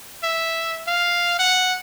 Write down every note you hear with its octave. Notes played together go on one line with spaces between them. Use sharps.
E5
F5
F#5